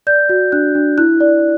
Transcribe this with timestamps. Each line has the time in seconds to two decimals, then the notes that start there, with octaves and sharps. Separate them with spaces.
0.07 D5 G6
0.29 F#4
0.52 D4 F#6
0.75 D4
0.98 E4 F#6
1.20 D5